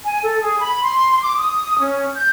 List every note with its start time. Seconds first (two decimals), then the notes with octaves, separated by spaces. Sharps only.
0.05 G#5
0.23 A4
0.41 G#4
0.60 B5
0.83 C6
1.22 D6
1.38 D#6
1.79 C#4
2.15 G6